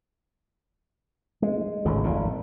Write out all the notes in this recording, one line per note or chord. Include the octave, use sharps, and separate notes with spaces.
G#3
G#1 C#2 A2 C#3
G#1 F2 A#2